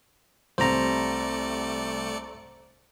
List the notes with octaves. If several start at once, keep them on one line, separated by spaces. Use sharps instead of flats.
C2 C3 A3 C5 D5 A#5 C#7